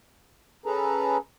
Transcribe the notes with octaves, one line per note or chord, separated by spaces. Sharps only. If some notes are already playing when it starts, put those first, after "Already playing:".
C#4 G#4 A4 B4 A#5